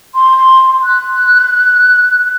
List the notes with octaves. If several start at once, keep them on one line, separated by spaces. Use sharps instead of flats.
C6
F#6